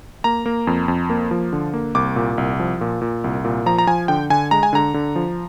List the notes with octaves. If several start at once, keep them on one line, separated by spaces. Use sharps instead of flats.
A#3 A#5
A#3
F2
F2
A#3
F3
D3
A#3
C2 D6
A#2
C2
F3
A#2
A#2
C2
A#2
F3 A#5
A#5
F3 G#5
D3 G5
D3 G#5
G#3 A#5
G#5
D3 A#5
D3
F3